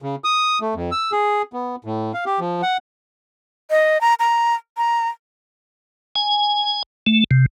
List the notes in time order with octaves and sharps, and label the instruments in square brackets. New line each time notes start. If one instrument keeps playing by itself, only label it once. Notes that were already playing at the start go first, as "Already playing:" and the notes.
[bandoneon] C#3
D#6
A3
F2
E6
G#4
B3
A2
F5
G4
F3
F#5
[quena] D#5
A#5
A#5
A#5
[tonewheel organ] G#5
A3
C3